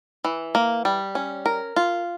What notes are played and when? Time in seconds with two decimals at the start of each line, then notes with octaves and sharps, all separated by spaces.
0.24 E3
0.55 A#3
0.85 G3
1.15 C#4
1.46 A#4
1.76 F4